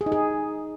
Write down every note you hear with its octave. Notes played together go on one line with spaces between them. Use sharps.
G#4
D#4
G#4